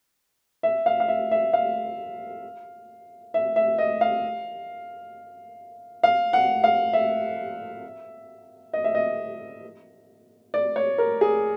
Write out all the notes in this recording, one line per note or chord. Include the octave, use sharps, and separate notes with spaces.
E5
F5
F5
E5
E5
F5
E5
E5
D#5
F5
F5
F#5
F5
E5
D#5
E5
D#5
D5
C#5
A#4
G#4